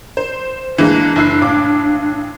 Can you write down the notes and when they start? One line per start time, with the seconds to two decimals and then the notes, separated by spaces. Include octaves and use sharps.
0.17 C5
0.78 E3 G#3 A#3 D4
1.16 F#1 E4 C7
1.41 A1 F5 D6